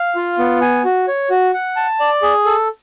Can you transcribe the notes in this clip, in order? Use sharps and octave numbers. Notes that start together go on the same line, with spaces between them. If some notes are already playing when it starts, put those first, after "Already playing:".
Already playing: F5
F4
B3
G#5
F#4
C#5
F#4
F#5
A5
D5
G#4
A4